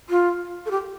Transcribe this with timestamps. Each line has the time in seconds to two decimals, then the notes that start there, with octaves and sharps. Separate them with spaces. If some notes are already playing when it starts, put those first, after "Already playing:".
0.10 F4
0.66 A4
0.71 G4